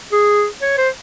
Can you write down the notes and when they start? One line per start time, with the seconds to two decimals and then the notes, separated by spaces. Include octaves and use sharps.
0.13 G#4
0.62 C#5
0.78 C5